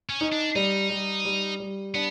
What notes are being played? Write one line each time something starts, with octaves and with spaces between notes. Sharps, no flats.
C#4
D#4
D4
G3 D#4
G3
G3
G3
B3 D4